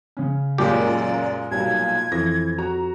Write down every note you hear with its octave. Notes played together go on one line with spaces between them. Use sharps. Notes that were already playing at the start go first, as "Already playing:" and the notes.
C#3 C#4
C#2 F#2 A#2 G#3 G4 A#4 D5
B1 F#3 G3 G#6
F2 E3 A#6
F#4 A#5